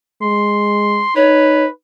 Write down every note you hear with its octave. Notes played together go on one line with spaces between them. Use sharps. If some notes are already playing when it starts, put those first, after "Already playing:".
G#3 C6
D#4 B4 C#5